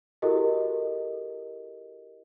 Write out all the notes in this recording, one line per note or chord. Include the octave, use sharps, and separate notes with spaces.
E4 F#4 G4 A4 A#4 D#5